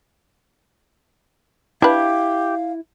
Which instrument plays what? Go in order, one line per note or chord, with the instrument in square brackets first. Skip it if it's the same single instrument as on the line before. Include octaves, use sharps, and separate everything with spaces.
[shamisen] D4 B4 [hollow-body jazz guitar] E4 [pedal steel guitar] G4 [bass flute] F5